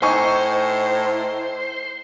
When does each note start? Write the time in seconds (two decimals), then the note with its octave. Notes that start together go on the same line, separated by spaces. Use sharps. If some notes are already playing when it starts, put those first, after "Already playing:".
0.02 A2 D#4 C5 G#5 C#6